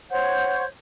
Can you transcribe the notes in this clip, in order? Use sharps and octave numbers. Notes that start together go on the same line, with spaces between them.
C5 C#5 F#5 G6